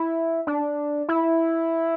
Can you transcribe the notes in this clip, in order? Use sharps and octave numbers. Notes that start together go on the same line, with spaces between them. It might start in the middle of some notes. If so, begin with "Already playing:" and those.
Already playing: E4
D4
E4